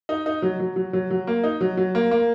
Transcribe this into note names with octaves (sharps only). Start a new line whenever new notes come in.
D#4
D#4
F#3
F#3
F#3
F#3
F#3
A#3
D#4
F#3
F#3
A#3
A#3